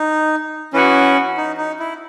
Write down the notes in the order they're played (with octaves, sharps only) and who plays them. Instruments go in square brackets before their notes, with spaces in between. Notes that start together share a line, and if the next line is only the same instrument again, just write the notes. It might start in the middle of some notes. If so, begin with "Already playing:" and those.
Already playing: [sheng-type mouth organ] D#4
[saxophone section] E3 B3 F#4 [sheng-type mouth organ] C#4
[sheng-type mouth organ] D#4
D#4
E4